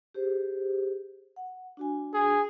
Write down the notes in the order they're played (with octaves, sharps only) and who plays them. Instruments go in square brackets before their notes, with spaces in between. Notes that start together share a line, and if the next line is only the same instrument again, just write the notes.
[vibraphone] G4 G#4 C5
F#5
D4 F#4 G#5
[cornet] G#4